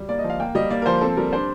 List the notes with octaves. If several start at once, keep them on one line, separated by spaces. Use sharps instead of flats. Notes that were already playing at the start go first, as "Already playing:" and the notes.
Already playing: G3
A#3 D5
D#5
F3
F5
A#3 G5
G3 D#5
A#3 D5
A#4
F3 C5
C4 A4
G3 A#4
D4 C5